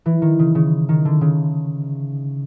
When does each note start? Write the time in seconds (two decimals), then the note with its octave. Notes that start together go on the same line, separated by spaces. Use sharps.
0.06 E3
0.22 D#3
0.39 C#3
0.55 C#3
0.89 D#3
1.05 D3
1.21 C#3